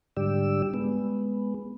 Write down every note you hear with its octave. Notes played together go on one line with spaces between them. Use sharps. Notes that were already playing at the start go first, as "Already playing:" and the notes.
G#2 D3 G3 G4 D5 E6
G#3 B3